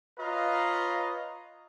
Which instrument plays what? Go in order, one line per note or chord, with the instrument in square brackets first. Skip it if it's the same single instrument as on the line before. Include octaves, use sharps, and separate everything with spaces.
[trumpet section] F4 B4 C#5 D#5 F5 A#5